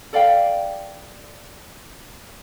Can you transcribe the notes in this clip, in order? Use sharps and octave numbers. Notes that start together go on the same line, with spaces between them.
A4 D5 F5 G5